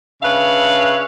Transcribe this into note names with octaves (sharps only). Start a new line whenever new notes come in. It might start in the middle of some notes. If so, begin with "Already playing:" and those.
C#3 D4 B4 C#5 E5 F5